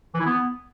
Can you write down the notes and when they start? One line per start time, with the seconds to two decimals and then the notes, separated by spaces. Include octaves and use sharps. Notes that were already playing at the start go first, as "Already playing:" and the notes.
0.15 E3
0.20 E4
0.26 B3